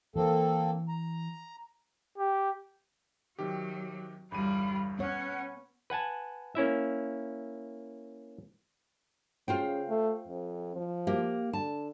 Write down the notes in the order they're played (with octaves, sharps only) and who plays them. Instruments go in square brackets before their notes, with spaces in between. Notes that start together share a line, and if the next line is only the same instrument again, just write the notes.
[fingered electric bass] E3 [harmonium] A#3 C4 A4
[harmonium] A#5
[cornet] G4
[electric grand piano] C3 D#3 G4 [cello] F#3
[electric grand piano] G1 E2 D#7 [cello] G3 F4 [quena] B5
[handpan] B3 C#5 [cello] C#4 [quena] F#5
[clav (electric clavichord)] B4 F#5 G#5 A5
A#3 C#4 E4 E5
[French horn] C#3 [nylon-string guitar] F4 C5 G5
[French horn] A3
F2
F3
[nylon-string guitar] A#3 G4
[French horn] D3 [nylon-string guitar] A5